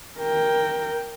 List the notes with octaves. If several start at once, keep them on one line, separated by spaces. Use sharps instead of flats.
A#4 G5